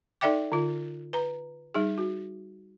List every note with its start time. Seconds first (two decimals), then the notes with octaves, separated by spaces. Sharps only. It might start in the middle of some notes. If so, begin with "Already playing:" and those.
0.21 D#4 A4 D5 E5 G5 D6
0.52 D3 F4
1.13 B4 A#5
1.74 G3 D#4 G#4
1.98 F#4